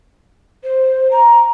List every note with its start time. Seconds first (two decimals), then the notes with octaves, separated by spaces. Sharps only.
0.63 C5
1.10 A#5